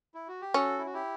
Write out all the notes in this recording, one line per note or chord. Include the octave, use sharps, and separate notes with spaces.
E4
F#4
G4
C#4 F#4 A4
E4
F#4
E4 G4